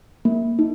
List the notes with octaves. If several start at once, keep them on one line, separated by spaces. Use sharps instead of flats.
A#3
D#4